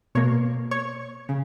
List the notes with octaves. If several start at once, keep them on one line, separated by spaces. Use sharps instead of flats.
B2 A#3 C#5
C#5
C#3